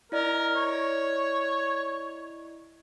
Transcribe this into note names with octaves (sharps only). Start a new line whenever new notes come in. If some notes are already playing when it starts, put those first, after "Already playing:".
E4 A#4 D5 D#5
C#5